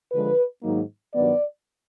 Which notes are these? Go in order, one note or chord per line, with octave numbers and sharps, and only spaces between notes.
D3 F3 G#3 B4
G#2 D#3 F#3 A#3 D#4
G2 D#3 F#3 B3 D5